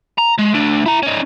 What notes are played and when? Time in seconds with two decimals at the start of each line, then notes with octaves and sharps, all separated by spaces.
0.18 A#5
0.38 G#3
0.54 A3 D4
0.86 E4 A#5
1.03 C#4 D#4